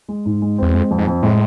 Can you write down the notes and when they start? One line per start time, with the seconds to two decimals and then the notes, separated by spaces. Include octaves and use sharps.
0.09 G#3
0.26 G#2
0.42 G#3
0.58 E2 C4
0.74 F2 G#3
0.91 F2
0.98 G#2
1.07 F2
1.23 A2 G#3